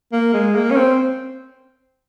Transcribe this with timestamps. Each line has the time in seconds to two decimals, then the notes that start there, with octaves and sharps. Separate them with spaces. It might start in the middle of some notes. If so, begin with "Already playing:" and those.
0.12 A#3
0.33 G#3
0.55 A#3
0.71 C#4
0.76 C4